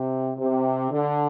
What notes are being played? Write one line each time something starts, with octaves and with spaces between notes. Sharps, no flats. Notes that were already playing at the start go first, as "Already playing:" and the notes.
Already playing: C3
C3
D3